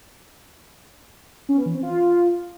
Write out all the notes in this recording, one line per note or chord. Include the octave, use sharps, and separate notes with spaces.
C#4
B3
E3
C4
F4